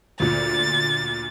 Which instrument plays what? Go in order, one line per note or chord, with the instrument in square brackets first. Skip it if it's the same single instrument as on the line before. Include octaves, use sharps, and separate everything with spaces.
[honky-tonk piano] D2 A#2 [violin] A6